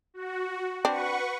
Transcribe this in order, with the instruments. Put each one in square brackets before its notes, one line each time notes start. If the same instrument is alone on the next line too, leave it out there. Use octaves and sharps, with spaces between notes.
[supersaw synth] F#4
[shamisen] C4 D4 [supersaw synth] B4 F#5 C#6